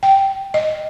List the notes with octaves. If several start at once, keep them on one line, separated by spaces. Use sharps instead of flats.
G5
D#5